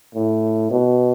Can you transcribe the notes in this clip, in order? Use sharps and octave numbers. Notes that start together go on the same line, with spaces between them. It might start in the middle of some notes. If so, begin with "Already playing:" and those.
A2
B2